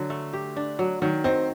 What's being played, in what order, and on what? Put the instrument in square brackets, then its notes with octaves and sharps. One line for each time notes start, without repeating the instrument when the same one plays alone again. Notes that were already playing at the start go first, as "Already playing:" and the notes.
Already playing: [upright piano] D3 [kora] F#3 D4
[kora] A3
G4
D4
F#3
[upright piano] D#3 [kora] F#3
[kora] D#3 [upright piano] C4